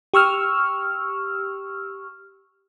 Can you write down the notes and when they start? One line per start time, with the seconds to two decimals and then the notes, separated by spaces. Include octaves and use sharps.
0.14 G4 C#6 E6 F6